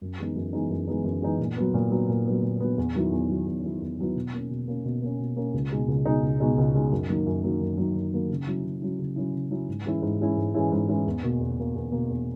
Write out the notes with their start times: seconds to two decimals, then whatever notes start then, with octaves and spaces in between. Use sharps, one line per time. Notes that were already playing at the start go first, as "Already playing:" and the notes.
0.01 F#2
0.18 E3 G#3 B3 D#4
0.35 F#2
0.53 E3 G#3 B3 D#4
0.70 F#2
0.88 E3 G#3 B3 D#4
1.04 F#2
1.22 E3 G#3 B3 D#4
1.40 A#2
1.57 F#3 B3
1.74 A#2
1.91 F#3 B3
2.08 A#2
2.26 F#3 B3
2.43 A#2
2.60 F#3 B3
2.78 E2
2.95 D#3 F#3 B3 E4
3.12 E2
3.29 D#3 F#3 B3 E4
3.46 E2
3.64 D#3 F#3 B3 E4
3.81 E2
3.98 D#3 F#3 B3 E4
4.16 B2
4.33 A#3 C#4
4.50 B2
4.68 A#3 C#4
4.85 B2
5.02 A#3 C#4
5.19 B2
5.37 A#3 C#4
5.54 C#2
5.71 B2 G#3 D#4
5.88 C#2
6.05 B2 G#3 D#4
6.23 C#2
6.40 B2 G#3 D#4
6.57 C#2
6.75 B2 G#3 D#4
6.91 F#2
7.09 D#3 F#3 A#3
7.26 F#2
7.44 D#3 F#3 A#3
7.61 F#2
7.78 D#3 F#3 A#3
7.95 F#2
8.13 D#3 F#3 A#3
8.30 C#3
8.47 F#3 C#4 E4
8.64 C#3
8.82 F#3 C#4 E4
8.99 C#3
9.16 F#3 C#4 E4
9.34 C#3
9.51 F#3 C#4 E4
9.69 G#2
9.86 E3 G#3 C#4 E4
10.02 G#2
10.20 E3 G#3 C#4 E4
10.37 G#2
10.54 E3 G#3 C#4 E4
10.72 G#2
10.89 E3 G#3 C#4 E4
11.06 E2
11.23 B2 A#3
11.40 E2
11.58 B2 A#3
11.75 E2
11.92 B2 A#3
12.09 E2